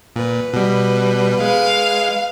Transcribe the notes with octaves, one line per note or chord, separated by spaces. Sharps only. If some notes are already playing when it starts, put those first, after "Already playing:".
A#2 B4
B2 G3
G#3 F5